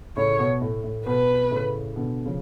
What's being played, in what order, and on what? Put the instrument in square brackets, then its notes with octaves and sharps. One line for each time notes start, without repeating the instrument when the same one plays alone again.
[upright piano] A2 C#3 [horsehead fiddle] C#5
[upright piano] B2
A2
A2
[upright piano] B2 [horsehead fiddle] B4
[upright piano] A2 C#3
B2 D3
C#3 F3